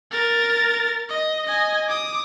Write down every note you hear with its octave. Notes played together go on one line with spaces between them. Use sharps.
A#4 A6
D#5
D#5 G#5
D6 D#6